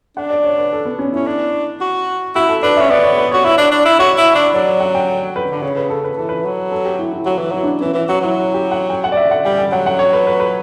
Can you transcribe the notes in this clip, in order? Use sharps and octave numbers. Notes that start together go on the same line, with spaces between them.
D4 F#5
D5
C#5
B4
A4
B3
C#4
C#4 E4
D4
F#4
E4 F#4
A4
D4 B4
C#4 E5
B3 D5
C#5
B4
F#4 C#5
E4 C#5
D4
D4
E4
F#4 C#5
E4
D4
F#3 D5
D5
F#5
G5
B4
D3
C#3 C#5
B4
A4
B4
E3 A4
B4
E3
F#3
A4
G4
E4
E4
F#3 F#4
E3
F#3 E4
D4
E3 C#4
E3
F#3 F#4
F#3 E4
G4
F#5
G5
F#5
D5
E5
F#5
G3 G5
G5
F#3 F#5
F#5
C#5
B4
B4
B4